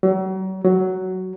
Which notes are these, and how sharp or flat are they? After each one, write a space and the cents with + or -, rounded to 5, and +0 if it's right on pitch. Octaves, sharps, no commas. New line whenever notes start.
F#3 +40
F#3 +10